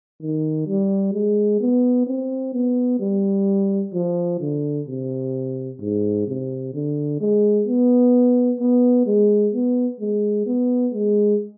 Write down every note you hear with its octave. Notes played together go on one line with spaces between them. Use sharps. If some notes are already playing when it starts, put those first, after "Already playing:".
D#3
G3
G#3
B3
C4
B3
G3
F3
D3
C3
G#2
C3
D3
G#3
B3
B3
G#3
B3
G#3
B3
G#3